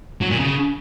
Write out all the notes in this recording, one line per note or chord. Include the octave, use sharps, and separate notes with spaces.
F#3
A#2
C#3